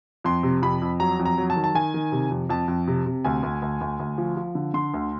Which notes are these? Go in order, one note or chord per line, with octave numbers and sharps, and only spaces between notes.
F2 C6
C3
F2 B5
F2
F#3 A#5
F2
A#5
F#3
A5
D#3
A5
D#3 G#5
D#3
C3
F2
F2 A5
F2
C3
C3
D2 G#5
D2
D2
D2
D2
F3
F3
D3
D3 C6
D2